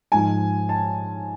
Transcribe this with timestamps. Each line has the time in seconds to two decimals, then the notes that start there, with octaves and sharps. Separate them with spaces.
0.12 G#2 F3 G#5
0.69 A5